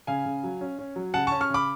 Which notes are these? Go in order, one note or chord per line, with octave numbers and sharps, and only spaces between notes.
C#3 F5 G#5
C#3
F#3
C#4
C#4
F#3
C#3 F#5 A5
C#4 A5 C#6
C#6 F6
C#3 B5 D6